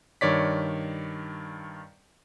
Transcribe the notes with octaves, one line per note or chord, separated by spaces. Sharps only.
G2 D#3 C#5 D5 B6